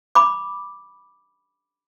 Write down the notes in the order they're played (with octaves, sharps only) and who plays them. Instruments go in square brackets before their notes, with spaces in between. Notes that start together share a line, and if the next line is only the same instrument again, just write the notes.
[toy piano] B5 D6